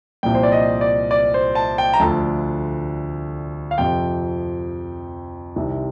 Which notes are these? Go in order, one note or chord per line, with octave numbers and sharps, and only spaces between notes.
C2 A#2 F3 G5
C5
D5
D#5
D5
D5
C5
A5
G5
A#5
D2 D3 F3 A5
F5
F2 C3 F3 G5
C2 C3 D#3